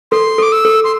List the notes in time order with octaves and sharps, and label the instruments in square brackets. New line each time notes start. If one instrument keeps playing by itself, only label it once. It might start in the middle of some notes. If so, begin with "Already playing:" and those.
[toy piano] A4 [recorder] C6
[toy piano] A4 [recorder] D6
[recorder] E6
[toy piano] A4
[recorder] C6